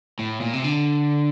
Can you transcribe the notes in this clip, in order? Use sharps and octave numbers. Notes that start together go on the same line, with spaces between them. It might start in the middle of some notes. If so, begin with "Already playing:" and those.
A2
A#2
C3
D3